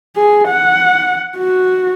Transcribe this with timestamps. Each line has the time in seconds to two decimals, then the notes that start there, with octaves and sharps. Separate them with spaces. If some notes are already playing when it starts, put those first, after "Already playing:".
0.16 G#4
0.48 F#5
1.37 F#4